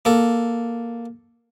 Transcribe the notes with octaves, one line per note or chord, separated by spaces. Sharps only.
A#3 A4